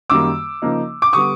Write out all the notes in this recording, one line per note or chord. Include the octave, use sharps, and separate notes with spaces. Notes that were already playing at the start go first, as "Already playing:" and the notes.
F#2 D#3 G3 A#3 D6 E6
C#3 F3 A#3 D#4
D6
D3 G3 B3 C#6 D#6